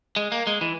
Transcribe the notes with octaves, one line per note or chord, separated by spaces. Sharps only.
G#3
A#3
G#3
E3